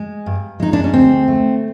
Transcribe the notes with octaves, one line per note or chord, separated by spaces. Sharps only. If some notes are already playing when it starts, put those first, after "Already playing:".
Already playing: G#3
G2
G#3 D#4
D4
C#4
D2 C4
A3